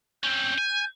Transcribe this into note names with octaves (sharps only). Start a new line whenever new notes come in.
C4 C#4 G6
G#5